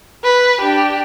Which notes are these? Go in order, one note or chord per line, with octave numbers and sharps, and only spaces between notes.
B4
D4 G4